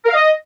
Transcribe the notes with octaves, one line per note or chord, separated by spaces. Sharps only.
A#4
F5
D#5